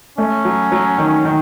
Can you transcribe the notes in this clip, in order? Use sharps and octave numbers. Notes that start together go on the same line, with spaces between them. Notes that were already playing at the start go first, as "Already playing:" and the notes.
A3 C#4
F#3
F#3
D#3
D#3